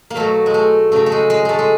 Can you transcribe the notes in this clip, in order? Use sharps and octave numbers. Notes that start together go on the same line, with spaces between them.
A#3
B2 F#3 A3
G#3
A3
C#3 F#3 A3
A3
G#3
G#3
G#3 A3
G#3